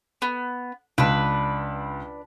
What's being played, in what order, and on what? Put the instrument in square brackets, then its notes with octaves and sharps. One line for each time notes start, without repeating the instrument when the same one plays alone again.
[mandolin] B3
[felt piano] C#2 [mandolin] D4 B4